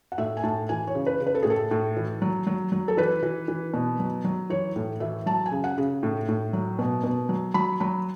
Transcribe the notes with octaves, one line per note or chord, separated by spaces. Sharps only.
F#5
A2 E5
G#5
A2 A5
E3 G#5
C#5
C#3
B4
C#3
B4
A4
A2 G#4
A4
A2
E3
F#3
F#3
F#3
A4
E3 B4
E3
E3
B2
F#3
F#3
E3 C#5
A2
E3 E5
F#3 A5
G#5
C#3
F#5
C#3
A2
A2
F#3
B2
B2
F#3
F#3 B5
F#3 B5